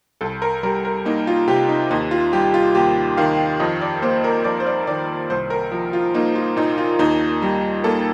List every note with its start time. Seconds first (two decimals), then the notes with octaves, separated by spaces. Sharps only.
0.21 C2 A4
0.42 A#4
0.63 G3 A#4
0.85 A#4
1.05 A#3 D#4
1.27 F4
1.48 C3 G4
1.69 D#4
1.91 D#2 D#4
2.11 F4
2.33 G3 G4
2.54 F4
2.75 D#2 G4
3.17 D#3 F5
3.60 F2 D#5
3.81 D5
4.02 A#3 C5
4.24 A#4
4.44 F2 D5
4.60 C5
4.66 D5
4.87 D#3 D5
5.30 C2 C5
5.50 A#4
5.72 F3
5.93 F4
6.14 A#3 D#4
6.35 F4
6.57 A#2 D#4
6.78 F4
6.99 D#2 D#4
7.42 G3
7.84 A#3 A4